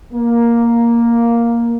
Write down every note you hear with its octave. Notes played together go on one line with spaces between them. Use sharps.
A#3